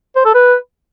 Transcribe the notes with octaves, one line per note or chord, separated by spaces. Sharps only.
C5
A4
B4